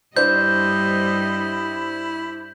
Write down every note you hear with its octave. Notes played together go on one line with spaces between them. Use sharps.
G2 G3 D4 E4 C5 D#5 G6